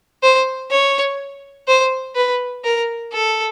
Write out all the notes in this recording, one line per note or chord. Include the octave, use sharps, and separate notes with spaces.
C5
C#5
C5
B4
A#4
A4